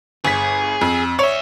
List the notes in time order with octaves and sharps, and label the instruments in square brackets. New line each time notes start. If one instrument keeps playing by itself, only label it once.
[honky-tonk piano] G1 B6 [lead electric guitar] G#4
[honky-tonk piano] F2
[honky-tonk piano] C#5 [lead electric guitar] D5 E5